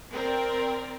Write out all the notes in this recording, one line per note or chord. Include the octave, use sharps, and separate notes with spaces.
C4 A#4 D5